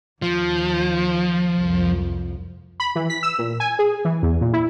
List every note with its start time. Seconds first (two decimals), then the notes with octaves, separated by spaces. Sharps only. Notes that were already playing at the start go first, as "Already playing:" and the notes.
0.22 D#2 F3
1.56 C2 F2
2.80 B5
2.95 E3
3.10 B6
3.23 E6
3.39 A#2
3.60 G#5
3.79 G#4
4.05 E3
4.23 E2
4.41 A#2
4.53 E4